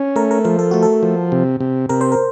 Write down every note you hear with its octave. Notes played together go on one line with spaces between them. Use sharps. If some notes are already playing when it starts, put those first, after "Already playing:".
Already playing: C#4
A3 A#4
A#4
F3 A#4
A4
A3 F#4
A4
F3
C3
C3
C3 A#4
C5
A#4